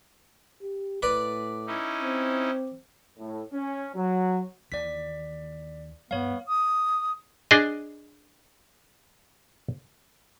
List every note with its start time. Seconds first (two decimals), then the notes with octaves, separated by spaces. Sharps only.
0.62 G4
1.02 A2 B4 D5
1.67 C#4 D#4 E4
2.02 C4
3.19 A2
3.52 C#4
3.94 F#3
4.72 D#2 D#3 E3 D5 B6
6.11 D2 G2 G3 B3 C#5 F5
6.48 D#6
7.51 D4 G#4 D#5